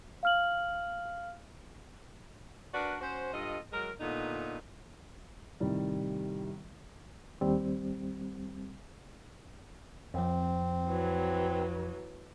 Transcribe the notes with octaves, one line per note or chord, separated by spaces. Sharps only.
F5 F6 F#7
D4 F#4 A#4 B4 D5
C#4 F#4 C5
G2 F4 A4 D#5
F#3 G#3 A#4
A#2 D3 A3 B3 D#4
A2 C3 D#3 G3
D#2 G3 C4
F2 F3 C4
E3 F#3